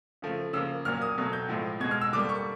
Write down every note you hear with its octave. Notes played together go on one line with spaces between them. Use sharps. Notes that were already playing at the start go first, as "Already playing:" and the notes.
C#3 F3 A3
C#3 F3 A#3 E6
A#2 F#3 A#3 F6
D#6
B2 F#3 A3
G6
A2 F3 G#3
B2 G#3 G#6
F6
E6
D3 G3 A#3 D6
C#6